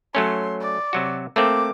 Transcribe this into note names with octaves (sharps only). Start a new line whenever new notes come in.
F#3 A3 C#4 C6
D5
C3 F#3 F#4
A3 A#3 C4 D6